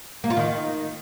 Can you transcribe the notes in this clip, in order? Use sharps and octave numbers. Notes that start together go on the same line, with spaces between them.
A#3
F4
D#3